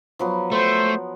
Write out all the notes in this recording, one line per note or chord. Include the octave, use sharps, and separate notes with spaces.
F3 F#3 B3
A3 C5